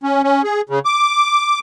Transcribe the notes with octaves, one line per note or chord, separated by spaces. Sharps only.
C#4
C#4
G#4
C#3
D6